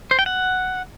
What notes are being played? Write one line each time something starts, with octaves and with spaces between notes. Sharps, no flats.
C5
G5
F#5